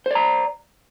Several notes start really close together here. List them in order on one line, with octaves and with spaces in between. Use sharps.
C5 D5 A#5